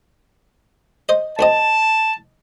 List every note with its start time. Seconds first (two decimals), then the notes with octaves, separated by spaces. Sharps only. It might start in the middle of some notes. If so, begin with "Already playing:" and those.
1.09 C5 D#5
1.39 D2 C4 D#5 A5